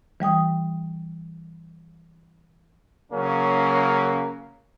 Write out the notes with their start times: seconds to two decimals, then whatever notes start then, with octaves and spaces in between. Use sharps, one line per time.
0.20 E3 G3 G5 D#6
3.12 C#3 F#3 A#3 C#4